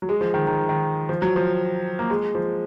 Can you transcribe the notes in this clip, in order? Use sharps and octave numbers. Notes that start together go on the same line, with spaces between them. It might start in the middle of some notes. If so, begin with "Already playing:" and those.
F#3
G#3
F3
D#3
D#3
D#3
F3
F#3
F3
A#3
G#3
F3